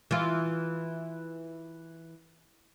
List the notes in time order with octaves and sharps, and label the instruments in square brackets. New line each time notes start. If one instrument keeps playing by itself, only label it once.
[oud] E3 F4